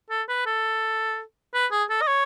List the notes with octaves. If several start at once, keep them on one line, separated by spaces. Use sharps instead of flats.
A4
B4
A4
B4
G#4
A4
D#5
C#5